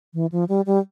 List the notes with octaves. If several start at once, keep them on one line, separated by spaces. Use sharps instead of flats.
E3
F3
G3
G3